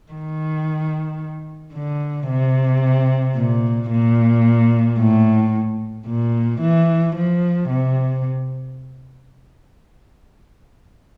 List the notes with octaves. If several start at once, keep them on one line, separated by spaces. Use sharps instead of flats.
D#3
D3
C3
A#2
A#2
A2
A#2
E3
F3
C3